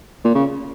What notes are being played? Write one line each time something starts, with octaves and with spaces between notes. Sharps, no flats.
A#2
C#3